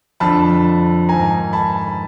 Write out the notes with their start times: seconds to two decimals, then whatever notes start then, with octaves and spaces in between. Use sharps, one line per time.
0.20 F2 D3 F3 A5 B5
1.09 G#2 D#3 G#5 A#5
1.53 A5 B5